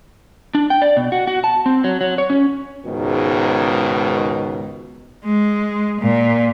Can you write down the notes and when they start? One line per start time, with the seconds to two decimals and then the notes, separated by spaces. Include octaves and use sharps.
0.55 D4
0.70 G5
0.82 D5
0.97 B2
1.12 F#4
1.27 F#4
1.44 A5
1.66 C4
1.84 F#3
2.01 F#3
2.18 C#5
2.30 C#4
2.85 C#2 G#2 B2 D#3
5.24 G#3
6.01 A#2